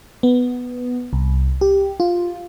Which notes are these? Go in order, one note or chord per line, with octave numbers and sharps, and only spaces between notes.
B3
C2
G4
F4